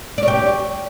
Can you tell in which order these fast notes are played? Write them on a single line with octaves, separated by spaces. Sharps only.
D5 C#5 G4